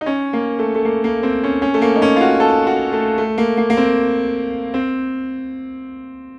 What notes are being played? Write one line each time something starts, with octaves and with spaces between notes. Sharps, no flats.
D#4
C#4
A#3
A3
A3
A#3
A#3
C4
C#4
C#4
A3
A#3
D#4
C#4
F4
F#4
A4
F#4
A3
A3
A#3
A#3
A#3
C4
C4